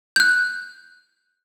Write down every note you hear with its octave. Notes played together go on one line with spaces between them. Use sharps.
F#6 G6